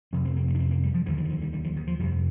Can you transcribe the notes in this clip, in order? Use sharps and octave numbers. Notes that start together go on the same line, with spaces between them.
F2 C3 C4
C4
A#3
A3
D4
C4
A#3
G3
F3
D#2 D3 F3
F3
D#3
F3
G3
G3
F3
D#3
F3
F2 C3 G3